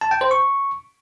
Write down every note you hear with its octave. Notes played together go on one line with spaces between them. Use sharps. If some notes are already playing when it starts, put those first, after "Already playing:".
A5
G5
C5
C#6